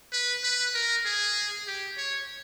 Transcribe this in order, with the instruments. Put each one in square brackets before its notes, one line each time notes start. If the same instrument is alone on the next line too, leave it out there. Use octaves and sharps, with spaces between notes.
[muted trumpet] B4
B4
A#4
G#4
G4
C#5